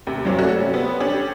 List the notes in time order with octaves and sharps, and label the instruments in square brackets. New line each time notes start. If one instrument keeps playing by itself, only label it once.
[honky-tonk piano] D#2 C3
G2 F#3 A#3 C4 C#4
A3 C#4 F#4 A4
C3 G3 C#4
B3 C4
C#4 D4 G4 A4